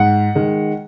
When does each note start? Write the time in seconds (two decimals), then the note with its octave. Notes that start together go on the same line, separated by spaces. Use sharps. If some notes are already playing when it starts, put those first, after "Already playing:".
Already playing: G#2 F#5
0.35 D#3 G#3